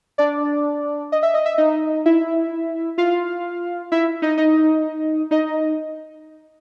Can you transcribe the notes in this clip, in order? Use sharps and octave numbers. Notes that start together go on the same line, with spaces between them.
D4 D5
D#5
E5
D#5
E5
D#4 D#5
E4 E5
F4 F5
E4 E5
D#4 D#5
D#4 D#5
D#4 D#5